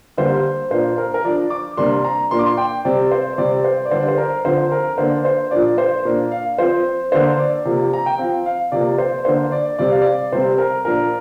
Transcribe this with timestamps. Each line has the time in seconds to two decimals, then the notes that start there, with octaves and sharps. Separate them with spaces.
0.18 D3 G3 A#3 C5
0.71 A#2 A#3 D4 C5
0.98 A#4
1.14 A#4
1.24 F3 D4 D5
1.50 D6
1.77 C3 G3 A#3 D4 C6
2.04 A#5
2.31 A#2 A#3 D4 C6
2.39 D6
2.46 C6
2.57 G5
2.85 C3 G3 C4 D5
3.11 C5
3.38 C3 G3 C4 D5
3.64 C5
3.85 D5
3.91 D3 G3 D4 C5
4.08 C5
4.18 A#4
4.45 D3 F3 C4 C5
4.72 A#4
4.98 D3 A#3 D4 C5
5.25 C5
5.51 A#2 F3 A#3 D4 D5
5.78 C5
6.05 A#2 A#3 D4
6.31 F5
6.58 F3 C4 C5
7.12 D3 A#3 D4 C5
7.39 D5
7.65 C3 F3 A#3
7.93 A#5
8.06 G5
8.18 F3 C4 F5
8.46 F5
8.72 C3 F3 A#3 D5
8.98 C5
9.25 D3 A#3 D4 C5
9.52 D5
9.79 C3 G3 C4 D5
9.90 F5
10.02 D5
10.32 C3 G3 C4 C5
10.58 A#4
10.85 A#2 F3 A#3 D4 A#4